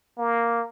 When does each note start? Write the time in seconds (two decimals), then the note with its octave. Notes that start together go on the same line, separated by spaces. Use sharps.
0.18 A#3